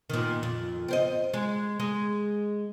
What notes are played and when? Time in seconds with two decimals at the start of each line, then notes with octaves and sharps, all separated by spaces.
0.10 A#2 D#3
0.43 F2
0.88 C4 C5 D#5
1.34 G#3
1.80 G#3